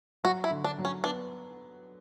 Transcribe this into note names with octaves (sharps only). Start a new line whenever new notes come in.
F#3 F#4
E4
D3
D4
F#3
C#4
B3 D4